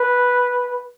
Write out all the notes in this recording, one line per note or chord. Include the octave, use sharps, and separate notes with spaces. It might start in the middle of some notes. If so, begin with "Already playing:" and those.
Already playing: B4